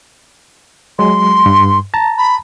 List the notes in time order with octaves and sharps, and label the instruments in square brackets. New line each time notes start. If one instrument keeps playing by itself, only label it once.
[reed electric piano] F#3 G#3 [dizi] C6
[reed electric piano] G2
A5 A#5
[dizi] B5